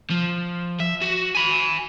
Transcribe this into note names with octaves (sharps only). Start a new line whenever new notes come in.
F3
E5
F#4
G#5 B5